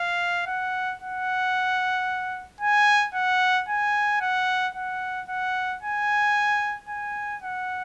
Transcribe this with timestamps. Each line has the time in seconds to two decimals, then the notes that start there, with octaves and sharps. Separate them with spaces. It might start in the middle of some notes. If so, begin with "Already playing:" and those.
Already playing: F5
0.47 F#5
1.01 F#5
2.61 G#5
3.14 F#5
3.68 G#5
4.21 F#5
4.75 F#5
5.29 F#5
5.82 G#5
6.88 G#5
7.42 F#5